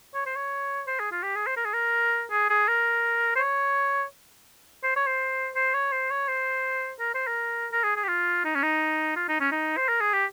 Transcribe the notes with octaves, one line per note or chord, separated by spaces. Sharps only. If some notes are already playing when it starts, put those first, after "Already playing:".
C#5
C5
C#5
C5
G#4
F4
G4
G#4
C5
A#4
G#4
A#4
G#4
G#4
A#4
C5
C#5
C5
C#5
C5
C5
C#5
C5
C#5
C5
A#4
C5
A#4
A#4
G#4
G#4
G4
F4
D#4
C#4
D#4
F4
D#4
C#4
D#4
C5
A#4
G#4
G4